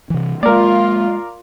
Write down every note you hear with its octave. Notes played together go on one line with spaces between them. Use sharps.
C3 E3
G#3 A#3 F4 A#4 D5